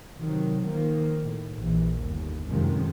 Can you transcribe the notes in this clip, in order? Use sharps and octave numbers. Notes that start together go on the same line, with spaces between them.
C3 D#3 F#3
D#3 F3 A#3
A2
A#1 E3
G1 D#2
F#2 A2 C3 D#3 F3 G#3